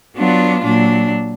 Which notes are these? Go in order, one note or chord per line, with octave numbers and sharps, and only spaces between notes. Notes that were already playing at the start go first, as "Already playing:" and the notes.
F#3 B3 D4 F4
A#2 F#3 D4